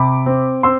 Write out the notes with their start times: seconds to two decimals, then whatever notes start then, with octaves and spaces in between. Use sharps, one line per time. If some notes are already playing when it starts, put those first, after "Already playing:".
Already playing: C3 B5 D6
0.26 C4
0.63 C4 C6 E6